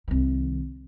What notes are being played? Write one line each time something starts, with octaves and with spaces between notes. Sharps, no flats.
C2 D#3